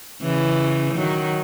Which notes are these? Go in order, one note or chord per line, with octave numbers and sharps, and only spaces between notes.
C#3 E3
D#3 F#3